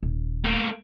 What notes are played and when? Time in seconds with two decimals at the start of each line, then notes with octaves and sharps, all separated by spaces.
0.03 D#1
0.45 A3 A#3